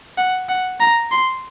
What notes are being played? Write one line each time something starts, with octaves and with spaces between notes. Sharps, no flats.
F#5
F#5
A#5
C6